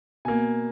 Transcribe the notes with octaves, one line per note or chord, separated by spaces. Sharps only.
B2 A#3 G#5